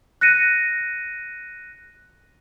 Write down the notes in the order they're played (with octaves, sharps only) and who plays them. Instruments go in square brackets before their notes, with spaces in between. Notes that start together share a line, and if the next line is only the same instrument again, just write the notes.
[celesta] F#6 A#6 C#7 D#7